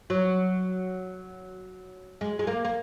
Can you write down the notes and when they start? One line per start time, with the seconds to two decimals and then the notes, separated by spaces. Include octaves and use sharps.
0.10 F#3
2.21 G#3
2.39 G#3
2.47 A#3
2.65 A#3